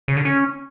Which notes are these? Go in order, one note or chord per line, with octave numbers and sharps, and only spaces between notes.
C#3
D3
C#4